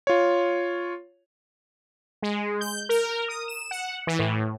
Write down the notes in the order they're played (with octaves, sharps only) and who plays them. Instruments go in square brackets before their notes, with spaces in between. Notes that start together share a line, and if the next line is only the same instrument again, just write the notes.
[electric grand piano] F4 C#5
[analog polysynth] G#3
G6
A#4
D#6
E7
F#5
E3
A2